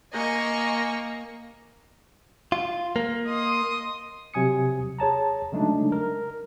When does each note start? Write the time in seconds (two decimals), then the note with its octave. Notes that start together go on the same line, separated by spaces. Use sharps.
0.13 A#3 D#5 G#5 C#6
2.52 F4
2.96 A#3
3.28 D#5 C6 D#6
4.34 C3 F#3 G#5 D#6 C#7
4.99 G#4 C#5 A5 A#5
5.52 C#3 F#3 G#3 A3 D4 D#4
5.92 A#4